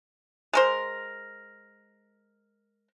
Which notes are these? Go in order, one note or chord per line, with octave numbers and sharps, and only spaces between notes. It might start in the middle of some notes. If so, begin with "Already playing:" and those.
G#3 A#4 C5